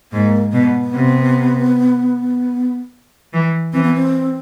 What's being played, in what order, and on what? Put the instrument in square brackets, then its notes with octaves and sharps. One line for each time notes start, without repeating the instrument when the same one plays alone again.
[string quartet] G#2 [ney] A#3
[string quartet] B2 [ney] B3
[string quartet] C3
E3
[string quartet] E3 [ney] C4
[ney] B3
C4